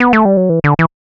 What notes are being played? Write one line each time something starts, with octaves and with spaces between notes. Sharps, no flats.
B3
A3
G3
F#3
E3
D3
E3